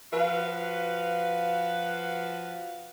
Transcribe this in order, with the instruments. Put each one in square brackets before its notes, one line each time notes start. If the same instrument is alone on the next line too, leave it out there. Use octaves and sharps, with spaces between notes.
[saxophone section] F3 F#4 B4 F5